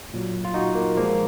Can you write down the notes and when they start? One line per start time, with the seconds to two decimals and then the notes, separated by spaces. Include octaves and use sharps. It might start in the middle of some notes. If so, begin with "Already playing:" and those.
0.14 A#2 F#3
0.45 F4
0.54 D#4 F#4
0.75 A#3
0.97 A#2 F3 G#3 A#3